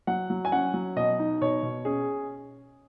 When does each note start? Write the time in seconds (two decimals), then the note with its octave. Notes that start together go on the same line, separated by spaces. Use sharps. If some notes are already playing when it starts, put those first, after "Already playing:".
0.07 F#3 F#5
0.30 F#3
0.45 G#5
0.52 C#4 F#5
0.74 F#3
0.96 B2 D#5
1.19 D#4
1.41 B2 C#5
1.63 B2
1.85 C#4 G#4